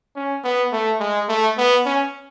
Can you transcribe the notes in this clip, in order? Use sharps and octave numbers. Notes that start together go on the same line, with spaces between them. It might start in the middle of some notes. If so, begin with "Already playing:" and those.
C#4
B3
A3
G#3
A3
B3
C#4